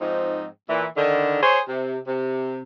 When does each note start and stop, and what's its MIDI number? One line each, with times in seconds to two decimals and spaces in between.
0.01 0.47 44
0.01 0.47 53
0.01 0.47 60
0.01 0.47 63
0.70 0.86 46
0.70 0.86 52
0.97 1.41 50
0.97 1.41 51
1.43 1.60 68
1.43 1.60 72
1.43 1.60 73
1.68 1.97 48
2.07 2.62 48